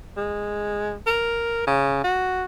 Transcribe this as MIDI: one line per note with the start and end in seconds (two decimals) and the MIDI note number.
0.17 0.96 56
1.06 1.66 70
1.67 2.03 49
2.04 2.44 66